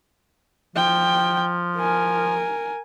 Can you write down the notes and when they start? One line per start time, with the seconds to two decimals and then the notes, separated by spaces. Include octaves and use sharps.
0.76 F3 G5
1.77 A#4 G#5